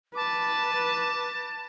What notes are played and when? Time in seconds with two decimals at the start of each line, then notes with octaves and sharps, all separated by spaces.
0.16 B4 A5 D6